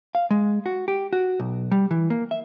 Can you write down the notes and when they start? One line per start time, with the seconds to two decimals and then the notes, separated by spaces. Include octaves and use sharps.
0.15 F5
0.30 G#3
0.66 F#4
0.88 G4
1.13 F#4
1.40 B1
1.71 G3
1.91 E3
2.10 A#3
2.31 E5